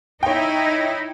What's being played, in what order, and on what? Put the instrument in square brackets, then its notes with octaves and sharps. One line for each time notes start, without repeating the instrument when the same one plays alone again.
[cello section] D#4 E4 [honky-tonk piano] C#5 G5